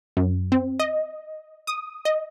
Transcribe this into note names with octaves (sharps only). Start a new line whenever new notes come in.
F#2
C4
D#5
D#6
D#5